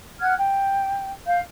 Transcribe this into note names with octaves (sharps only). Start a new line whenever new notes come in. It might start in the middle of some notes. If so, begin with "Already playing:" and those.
F#5 F6 F#6 G#6
G5
F5 G6